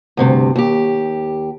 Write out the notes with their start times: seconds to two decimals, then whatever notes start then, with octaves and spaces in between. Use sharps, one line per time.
0.17 D2 G2 C3
0.56 D#2 G4